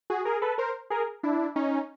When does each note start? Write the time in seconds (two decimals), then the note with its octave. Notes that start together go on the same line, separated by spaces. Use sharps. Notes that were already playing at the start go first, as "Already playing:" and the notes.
0.10 F#4 G#4
0.25 G#4 A#4
0.42 A4 B4
0.58 A#4 C5
0.90 G#4 A#4
1.23 D4 E4
1.56 C#4 D#4